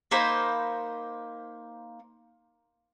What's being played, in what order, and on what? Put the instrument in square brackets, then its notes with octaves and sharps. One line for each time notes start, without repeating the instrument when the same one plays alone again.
[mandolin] A#3 D#4 C5 B5